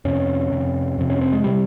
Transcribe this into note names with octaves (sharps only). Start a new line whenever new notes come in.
F2 C3 C#4
F2 C3
F2 C3
C#4
C4
G#3
C3 G3